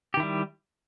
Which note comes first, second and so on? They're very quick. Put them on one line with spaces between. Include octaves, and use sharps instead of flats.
G4 D#3 E4 G3